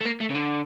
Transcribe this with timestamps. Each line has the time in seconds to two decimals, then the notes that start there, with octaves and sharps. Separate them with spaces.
0.01 A3
0.05 A#3
0.21 A3
0.31 C#3
0.35 D3